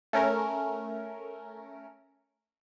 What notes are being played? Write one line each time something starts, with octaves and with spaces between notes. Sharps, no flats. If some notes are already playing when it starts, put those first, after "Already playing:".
A3 C#4 A#4